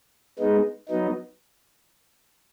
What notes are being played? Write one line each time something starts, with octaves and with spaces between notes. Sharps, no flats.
G#3 B3 D#4
F#3 B3 D#4